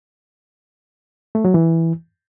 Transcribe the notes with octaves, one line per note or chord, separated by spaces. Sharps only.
A3
F#3
E3